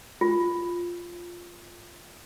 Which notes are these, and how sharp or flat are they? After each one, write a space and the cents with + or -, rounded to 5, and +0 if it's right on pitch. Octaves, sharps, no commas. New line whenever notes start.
F4 +0